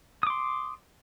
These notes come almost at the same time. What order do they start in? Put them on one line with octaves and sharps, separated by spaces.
D#6 D6 C6